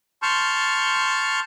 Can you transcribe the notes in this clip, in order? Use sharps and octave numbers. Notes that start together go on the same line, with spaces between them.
A5 C6 C#6 F6 G6